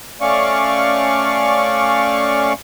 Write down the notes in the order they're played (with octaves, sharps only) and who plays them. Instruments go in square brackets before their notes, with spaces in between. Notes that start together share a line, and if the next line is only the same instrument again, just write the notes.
[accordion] A3 C#4 D5 F5 C#6